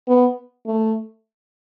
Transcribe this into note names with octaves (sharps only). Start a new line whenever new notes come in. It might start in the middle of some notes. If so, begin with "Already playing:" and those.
B3
A3